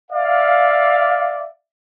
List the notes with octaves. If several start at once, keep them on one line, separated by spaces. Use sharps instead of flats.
D5 E5 F5